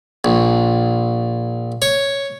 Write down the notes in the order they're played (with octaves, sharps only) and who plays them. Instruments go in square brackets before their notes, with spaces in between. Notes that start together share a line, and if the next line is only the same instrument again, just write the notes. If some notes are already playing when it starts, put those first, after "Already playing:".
[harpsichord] A#1
C#5